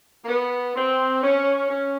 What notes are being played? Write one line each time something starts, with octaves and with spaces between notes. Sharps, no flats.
A#3
B3
C4
C#4
C#4